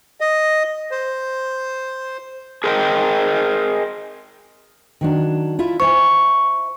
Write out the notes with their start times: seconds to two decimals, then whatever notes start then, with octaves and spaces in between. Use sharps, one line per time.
0.21 D#5
0.91 C5
2.64 G#4 A#4 C5 D#5 F#5 G5
5.01 D#3 F#3 D4
5.59 E4 F4 E5
5.80 C5 E5 G#5 C#6